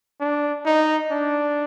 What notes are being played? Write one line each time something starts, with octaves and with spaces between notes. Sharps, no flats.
D4
D#4
D4